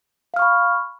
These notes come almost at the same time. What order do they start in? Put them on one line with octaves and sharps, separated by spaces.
F5 F6 C#6 B5